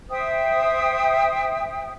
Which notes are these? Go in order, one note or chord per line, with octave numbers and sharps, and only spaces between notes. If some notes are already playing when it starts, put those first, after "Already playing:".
C5 E5 G5 D#6